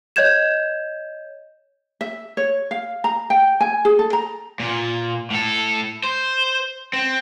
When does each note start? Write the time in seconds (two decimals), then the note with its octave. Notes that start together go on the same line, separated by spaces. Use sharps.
0.16 C#5 D#5 G6 G#6 E7
2.01 E5
2.37 C#5
2.71 F5
3.04 A#5
3.30 G5
3.61 G#5
3.85 G#4
3.99 A4
4.13 A#5
4.60 A#2
5.30 A2 A4
6.04 C5
6.93 C4